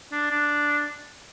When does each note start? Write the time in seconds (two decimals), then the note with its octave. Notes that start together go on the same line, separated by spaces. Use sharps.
0.12 D4
0.31 D4